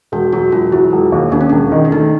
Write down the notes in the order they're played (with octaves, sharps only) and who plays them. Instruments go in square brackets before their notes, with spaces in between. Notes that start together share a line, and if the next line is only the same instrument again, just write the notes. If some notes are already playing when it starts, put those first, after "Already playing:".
[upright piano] E1 [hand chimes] F#4
[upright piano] F#3 [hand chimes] F#4
[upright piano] E1 [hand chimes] F4
[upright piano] F#3 [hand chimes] E4
[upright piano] E1
D#2
[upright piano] D#2 [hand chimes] D4
[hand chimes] C#4
[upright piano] E1 [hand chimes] D4
[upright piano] D#3
[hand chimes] D4
[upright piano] A3 [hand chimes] D#4